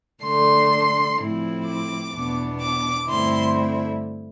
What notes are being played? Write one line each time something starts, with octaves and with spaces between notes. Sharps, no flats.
D3 A3 D4 C6
A2 F3 C4 E4
D6
E2 B2 B3 D4
D6
G2 D3 A3 C4 E4 C6